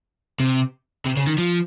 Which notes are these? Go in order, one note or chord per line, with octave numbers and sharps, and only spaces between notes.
C3
C3
C#3
D#3
F3